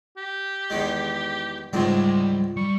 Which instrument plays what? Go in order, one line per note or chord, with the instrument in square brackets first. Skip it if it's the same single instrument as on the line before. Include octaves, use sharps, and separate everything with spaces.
[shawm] G4
[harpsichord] E2 D#3 G#3
[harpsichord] C#2 G#2 C4 [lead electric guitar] G3 C6
[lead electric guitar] G3 [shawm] C#6